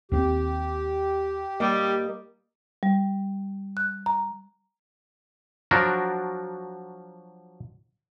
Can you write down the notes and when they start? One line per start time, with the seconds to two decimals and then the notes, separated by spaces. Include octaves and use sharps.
0.12 D#2 B3 C4 G4
1.60 G3 A#3 D#5
2.83 G3
3.77 F#6
4.06 A#5
5.71 F3 F#3 D4 F#4 A#4